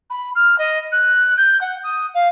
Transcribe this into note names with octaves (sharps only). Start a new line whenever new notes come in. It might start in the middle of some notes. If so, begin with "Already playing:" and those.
B5
F6
D#5
F#6
G6
F#5
D#6
F5